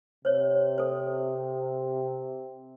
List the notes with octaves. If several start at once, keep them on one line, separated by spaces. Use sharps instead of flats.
C3 C5 C#5
A4 C5